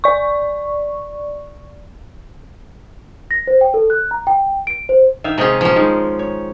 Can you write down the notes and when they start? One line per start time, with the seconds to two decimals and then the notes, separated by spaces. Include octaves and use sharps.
0.04 D5 C#6
3.31 A#6
3.47 C5
3.61 G5
3.74 A4
3.90 F#6
4.11 A#5
4.27 G5
4.67 D7
4.89 C5
5.24 D#3 E5 F5
5.38 C3 G#3 C#4 D#4 G#4
5.61 F3 C#4
5.76 D#3 G#3
6.19 C#5